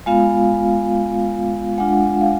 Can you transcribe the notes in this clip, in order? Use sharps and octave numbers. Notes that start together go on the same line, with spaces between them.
G#3 B3 F4 F5
G#3 D4 F4 F#5
F5